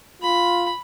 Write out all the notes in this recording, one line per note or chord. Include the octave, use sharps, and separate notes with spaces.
F4 B5